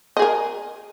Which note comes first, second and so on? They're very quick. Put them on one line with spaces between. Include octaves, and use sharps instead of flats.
D#5 G#4 A#4